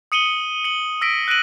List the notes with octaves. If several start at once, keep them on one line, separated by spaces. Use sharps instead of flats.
D#6 C#7 D#7 F#7 G7
C#7 F#7
E6 A#6 B6 D7
F#6 A#6 D7 D#7 F#7